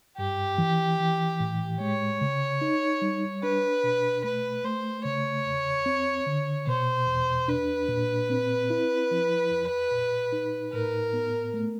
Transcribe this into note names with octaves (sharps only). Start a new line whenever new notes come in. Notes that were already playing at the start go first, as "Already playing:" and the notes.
G2 G4
E3
E3
A2
G#3 C#5
C#3
D#4
G3
D4 B4
B2
A3 B4
A3 C5
C#3 C#5
E2
C4
D3
B2 C5
E2
D4 B4
A#2
C4
E4
F3
F2
A#2
D#4
A2 A#4
B3
A3